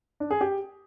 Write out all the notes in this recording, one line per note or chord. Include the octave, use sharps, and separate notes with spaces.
D4
G#4
G4